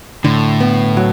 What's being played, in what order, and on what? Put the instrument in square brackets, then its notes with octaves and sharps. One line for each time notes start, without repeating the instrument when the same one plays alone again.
[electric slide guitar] A2 [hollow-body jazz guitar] D3
[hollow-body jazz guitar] B3
F#3